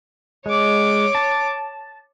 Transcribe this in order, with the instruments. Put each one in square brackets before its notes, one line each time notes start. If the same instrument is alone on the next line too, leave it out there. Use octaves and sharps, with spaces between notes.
[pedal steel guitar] G#3 [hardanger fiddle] C#5 D6
[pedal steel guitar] A5